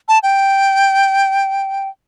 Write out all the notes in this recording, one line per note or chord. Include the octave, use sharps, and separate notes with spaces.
A5
G5